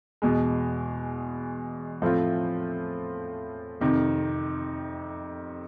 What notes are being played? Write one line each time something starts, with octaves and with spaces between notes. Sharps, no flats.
E2 B2 G#3
A2 F3 A3 C4 F4
F2 C3 D#3